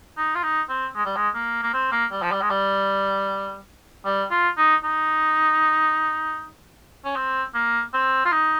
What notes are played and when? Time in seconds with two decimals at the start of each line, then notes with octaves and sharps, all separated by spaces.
0.17 D#4
0.35 F4
0.43 D#4
0.69 C4
0.95 G#3
1.06 G3
1.16 G#3
1.35 A#3
1.63 A#3
1.73 C4
1.92 A#3
2.11 G3
2.22 F3
2.32 G3
2.42 G#3
2.50 G3
4.06 G3
4.31 F4
4.57 D#4
4.84 D#4
7.05 C#4
7.16 C4
7.54 A#3
7.94 C4
8.25 F4
8.32 D#4